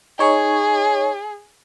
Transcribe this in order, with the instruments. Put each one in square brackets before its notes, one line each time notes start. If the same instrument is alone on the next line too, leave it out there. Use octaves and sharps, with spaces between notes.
[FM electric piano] D#4 C#5 [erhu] G#4